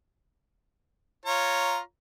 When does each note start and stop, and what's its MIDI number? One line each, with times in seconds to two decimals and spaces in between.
1.26 1.79 65
1.26 1.79 73
1.26 1.79 82